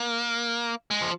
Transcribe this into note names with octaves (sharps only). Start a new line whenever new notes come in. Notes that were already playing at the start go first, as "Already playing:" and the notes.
Already playing: A#3
G#3
F3